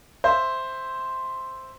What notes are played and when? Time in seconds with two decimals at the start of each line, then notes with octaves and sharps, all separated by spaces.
0.24 C5 E5